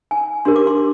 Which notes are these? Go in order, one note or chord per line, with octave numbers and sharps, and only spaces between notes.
G#5
D4 G4 A#4 C6
D6
C6